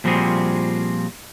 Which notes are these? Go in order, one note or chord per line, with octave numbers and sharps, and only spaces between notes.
A#2 F3 G3 C4 F#4 G#4